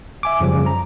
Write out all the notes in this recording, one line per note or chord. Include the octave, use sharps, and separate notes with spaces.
E5 G#5 D6
F#2 C#3 F3 G3
C#3
A#5